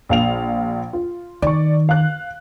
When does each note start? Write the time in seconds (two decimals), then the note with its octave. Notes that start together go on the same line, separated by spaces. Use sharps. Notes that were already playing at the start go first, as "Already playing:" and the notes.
0.09 A#1 F5 F7
0.93 F4
1.42 D#3 D5 C#6
1.89 F5 F#6